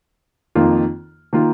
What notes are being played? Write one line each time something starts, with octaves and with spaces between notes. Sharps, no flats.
F2 D#3 A#3 F4
D#3 A#3 F4